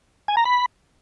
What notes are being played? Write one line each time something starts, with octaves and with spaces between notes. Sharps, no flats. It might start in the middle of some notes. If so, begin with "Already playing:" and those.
G#5
A#5
B5